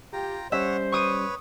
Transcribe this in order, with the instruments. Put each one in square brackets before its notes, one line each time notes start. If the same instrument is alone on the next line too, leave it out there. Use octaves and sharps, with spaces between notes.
[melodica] F4 G5 A#5 [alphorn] G4
[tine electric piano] G3 C#4 [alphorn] C5 [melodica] C#5 F#5 [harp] E5
[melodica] B4 C#5 [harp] C#6 D#6 D#7